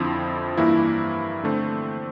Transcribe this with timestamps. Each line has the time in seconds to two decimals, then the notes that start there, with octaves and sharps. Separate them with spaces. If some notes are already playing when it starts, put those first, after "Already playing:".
Already playing: F2 D3 F3 C4 E4
0.57 G2 E3 A#3 E4
1.44 D3 A3 C4